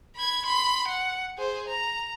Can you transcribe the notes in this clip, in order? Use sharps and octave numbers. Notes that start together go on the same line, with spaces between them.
B5 G#6
B5 C6
F#5
G#4 C5
A#5